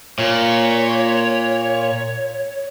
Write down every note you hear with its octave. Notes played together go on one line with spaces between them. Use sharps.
A#2 C#5